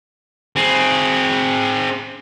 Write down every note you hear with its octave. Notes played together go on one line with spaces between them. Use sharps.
C4 G#4